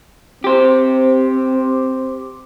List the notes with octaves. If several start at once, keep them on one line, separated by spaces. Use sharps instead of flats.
C4 G4 C5